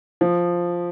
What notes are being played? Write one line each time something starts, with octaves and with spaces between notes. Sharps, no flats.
F3